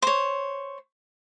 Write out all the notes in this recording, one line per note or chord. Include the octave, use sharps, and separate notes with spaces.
C5 C#5